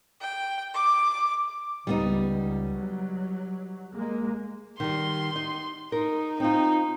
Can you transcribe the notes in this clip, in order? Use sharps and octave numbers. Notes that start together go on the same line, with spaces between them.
G5
D6
C#2 G3 B3 D#4
F#3
G#3 A#3
D#3 G3 C6
D#4
D#4 A#4
C4 D#4 F4